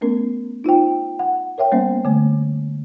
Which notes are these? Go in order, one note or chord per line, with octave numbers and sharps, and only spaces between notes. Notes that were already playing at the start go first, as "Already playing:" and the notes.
A3 B3 C#4 A#4
D#4 F4 C5 G5
F#5
A#4 C#5 E5 G5
G3 A#3 B3 C#4 C5
D3 A3